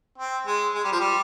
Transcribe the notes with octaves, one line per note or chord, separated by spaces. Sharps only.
C4
G#3
G#3
G3
F3
G3